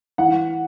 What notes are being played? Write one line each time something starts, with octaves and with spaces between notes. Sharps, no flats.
E3 F#5